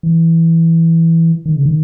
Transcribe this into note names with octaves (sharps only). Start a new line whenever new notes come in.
E3
D#3
C#3
D#3